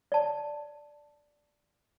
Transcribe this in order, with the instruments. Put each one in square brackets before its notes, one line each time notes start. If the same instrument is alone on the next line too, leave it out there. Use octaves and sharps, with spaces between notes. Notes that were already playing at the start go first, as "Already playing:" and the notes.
[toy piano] D5 A5